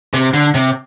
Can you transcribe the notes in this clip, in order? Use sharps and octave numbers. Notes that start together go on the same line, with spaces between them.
C3
D3
C3